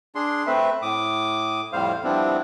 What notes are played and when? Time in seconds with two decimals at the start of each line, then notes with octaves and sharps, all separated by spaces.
0.15 D4 G#4 C6
0.47 A3 C4 B4 E5
0.82 A2 D6 D#6
1.73 F2 A2 G3 C5 F5
2.04 F3 G3 B3 C4 D4 E4